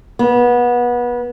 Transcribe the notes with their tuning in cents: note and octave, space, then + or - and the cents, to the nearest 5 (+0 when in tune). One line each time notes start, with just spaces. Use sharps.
B3 -25